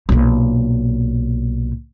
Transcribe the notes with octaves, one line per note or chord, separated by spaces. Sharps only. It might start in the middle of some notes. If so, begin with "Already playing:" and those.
B1 A#2